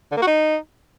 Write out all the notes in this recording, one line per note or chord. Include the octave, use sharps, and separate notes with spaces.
D3
A#3
F#4
D#4